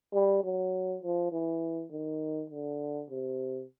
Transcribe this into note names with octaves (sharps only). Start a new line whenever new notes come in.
G3
F#3
F3
E3
D#3
D3
C3